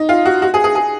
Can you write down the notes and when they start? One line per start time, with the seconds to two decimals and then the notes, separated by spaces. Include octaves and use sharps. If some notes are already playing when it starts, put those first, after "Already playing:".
Already playing: D#4
0.09 F4
0.25 F#4
0.42 F#4
0.54 G#4
0.64 G#4
0.75 G#4